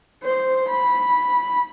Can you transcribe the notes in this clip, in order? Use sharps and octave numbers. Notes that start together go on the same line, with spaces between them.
C5
B5